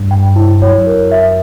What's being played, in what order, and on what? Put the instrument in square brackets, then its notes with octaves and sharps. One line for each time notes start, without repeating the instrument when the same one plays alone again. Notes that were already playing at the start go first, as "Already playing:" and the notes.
Already playing: [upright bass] G2
[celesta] G5
E4
[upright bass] F#2 [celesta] C#5
[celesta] A#4
E5